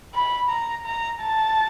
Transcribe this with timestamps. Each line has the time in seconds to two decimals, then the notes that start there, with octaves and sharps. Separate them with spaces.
0.14 B5
0.50 A#5
0.86 A#5
1.21 A5